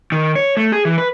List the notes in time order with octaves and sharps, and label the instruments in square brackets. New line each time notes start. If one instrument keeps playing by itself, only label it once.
[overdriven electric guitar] D#3
C#5
A3
G#4
E3
B4